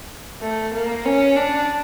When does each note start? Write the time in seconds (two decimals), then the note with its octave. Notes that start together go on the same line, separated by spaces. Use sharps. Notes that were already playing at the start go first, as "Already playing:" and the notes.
0.41 A3
0.74 A#3
1.05 C#4
1.36 D4